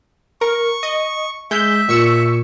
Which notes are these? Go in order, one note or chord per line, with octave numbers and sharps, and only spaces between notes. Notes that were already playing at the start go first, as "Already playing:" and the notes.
A#4 C#6
D#5
G#3 E5 G6
A#2 C#6 E6 C#7